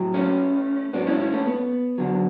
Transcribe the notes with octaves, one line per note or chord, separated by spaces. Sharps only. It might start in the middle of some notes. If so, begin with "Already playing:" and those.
Already playing: A2 F#3
A3 C#4
G#2 F#3 B3 D4
C#4 E4
C#4 E4
A3 C#4
B3
F#2 D3 F#3